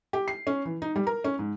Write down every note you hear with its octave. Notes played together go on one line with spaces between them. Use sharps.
G4
C7
C#4
E3
D#4
G3
A#4
C#4
G#2